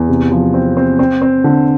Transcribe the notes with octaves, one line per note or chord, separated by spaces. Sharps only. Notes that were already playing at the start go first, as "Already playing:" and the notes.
Already playing: E2
C3
F3
C4
C4
C4
C4
D3